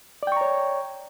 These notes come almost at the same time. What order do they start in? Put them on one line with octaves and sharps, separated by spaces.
D5 G5 C#6 A#5 C#5